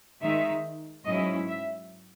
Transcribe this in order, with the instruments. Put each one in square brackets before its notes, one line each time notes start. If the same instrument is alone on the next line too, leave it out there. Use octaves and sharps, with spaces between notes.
[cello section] D#3 G#3 D#4 E5
G#2 F#3 C#4 E4 D#5
E5